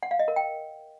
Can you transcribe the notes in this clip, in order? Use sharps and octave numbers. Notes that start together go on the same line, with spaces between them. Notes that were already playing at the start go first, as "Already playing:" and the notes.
F#5
F5
D#5
A#4
G5